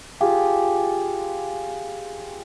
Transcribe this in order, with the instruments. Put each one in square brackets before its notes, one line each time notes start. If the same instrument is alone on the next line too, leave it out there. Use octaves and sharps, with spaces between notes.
[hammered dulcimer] F4 G4 G#4